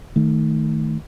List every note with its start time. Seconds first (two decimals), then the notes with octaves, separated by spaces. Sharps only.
0.16 D#3 A3